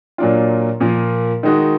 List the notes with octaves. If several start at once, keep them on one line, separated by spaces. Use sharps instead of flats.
A#2 F#3 D4 F4
A#2 F3 A#3
D#3 G#3 D#4 F#4